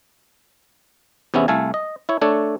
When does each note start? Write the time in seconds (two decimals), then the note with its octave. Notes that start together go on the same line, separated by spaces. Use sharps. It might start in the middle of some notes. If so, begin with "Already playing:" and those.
1.34 E2 C3 B3 C#4 E4
1.48 C2 A3 A4 F5 G#5
1.74 D#5
2.09 E4 C#5
2.21 A3 D4 A4 C#5